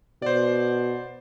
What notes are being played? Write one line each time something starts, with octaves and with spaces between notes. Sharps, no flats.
B2 C5 D5